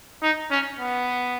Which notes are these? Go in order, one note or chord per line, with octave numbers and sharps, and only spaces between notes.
D#4
C#4
B3